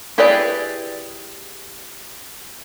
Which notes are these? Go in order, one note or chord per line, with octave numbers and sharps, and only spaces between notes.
E4 G4 G#4 B4 D5